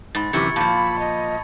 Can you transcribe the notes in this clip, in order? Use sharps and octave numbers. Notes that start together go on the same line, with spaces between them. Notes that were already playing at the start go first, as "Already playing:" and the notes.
G#2 B5 A6
F#2 C3 E3 G4 C#6 G#6 C#7
A#2 F3 A5 B5
D#5